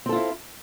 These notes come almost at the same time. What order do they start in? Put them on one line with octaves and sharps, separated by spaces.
C4 A4 F4 E4